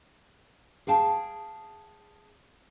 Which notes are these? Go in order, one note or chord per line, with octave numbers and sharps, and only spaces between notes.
G#4 F5 G5 A5